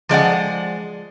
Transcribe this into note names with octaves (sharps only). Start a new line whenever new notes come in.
F3 G#3 D5 F#5